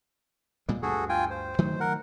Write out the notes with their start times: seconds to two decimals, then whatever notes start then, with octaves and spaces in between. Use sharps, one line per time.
0.69 A#2 G3 G#3
0.82 D2 G2 F#4 G#4 A4
1.09 F4 G5 G#5
1.31 C5
1.59 D#3 F#3 A3
1.80 A#4 F#5